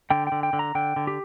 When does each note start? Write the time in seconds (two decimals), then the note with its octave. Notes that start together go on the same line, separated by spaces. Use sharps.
0.10 D3 G5
0.27 G5
0.32 D3
0.43 G5
0.53 D3
0.59 A#5
0.75 D3 G5
0.96 D3
1.07 G4